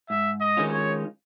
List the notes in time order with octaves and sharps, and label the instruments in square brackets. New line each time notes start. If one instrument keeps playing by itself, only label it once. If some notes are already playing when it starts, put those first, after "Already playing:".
[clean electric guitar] G#2 [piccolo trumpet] E5
[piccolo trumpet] D#5
[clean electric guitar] D#3 G#3 C#4 F4
[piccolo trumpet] C#5